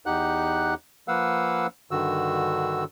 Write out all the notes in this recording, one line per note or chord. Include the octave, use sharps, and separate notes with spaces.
E2 D#4 G4 F#5 F#6
F3 A#3 B4 F5 F#5 E6
G2 D3 D#3 F#4 E6